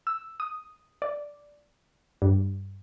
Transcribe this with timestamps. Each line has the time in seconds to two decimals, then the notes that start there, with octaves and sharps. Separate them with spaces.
0.07 E6
0.40 D#6
1.02 D5
2.22 G2